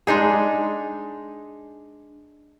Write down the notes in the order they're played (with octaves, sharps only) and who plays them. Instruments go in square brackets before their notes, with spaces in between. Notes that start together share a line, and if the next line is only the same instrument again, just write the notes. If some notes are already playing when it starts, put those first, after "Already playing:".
[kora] G#3 D4 D#4 G#4